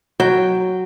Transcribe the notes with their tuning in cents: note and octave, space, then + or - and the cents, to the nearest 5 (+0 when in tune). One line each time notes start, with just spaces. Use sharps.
F#3 +0 G5 +0